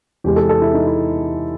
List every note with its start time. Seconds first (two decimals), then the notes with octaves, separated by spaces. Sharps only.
0.24 E2 C3 E3 G#3 G4
0.36 A4
0.49 A4
0.62 E4
0.74 D#4
0.87 E4